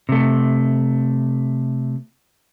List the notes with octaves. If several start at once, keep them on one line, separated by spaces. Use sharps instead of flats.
C3 A3